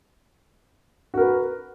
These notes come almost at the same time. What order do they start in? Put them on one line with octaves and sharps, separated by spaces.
F#4 A#4 B4